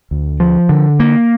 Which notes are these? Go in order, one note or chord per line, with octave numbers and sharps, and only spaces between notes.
D2
F3
D3
A#3